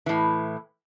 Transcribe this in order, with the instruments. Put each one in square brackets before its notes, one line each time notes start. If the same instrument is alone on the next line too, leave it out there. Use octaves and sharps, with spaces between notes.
[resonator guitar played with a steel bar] A2 E3